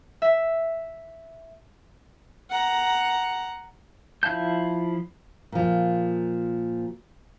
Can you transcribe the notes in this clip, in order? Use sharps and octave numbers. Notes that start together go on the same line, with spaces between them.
E5
F#5 A#5
F3 E4 F5 A5 G6
A#2 F3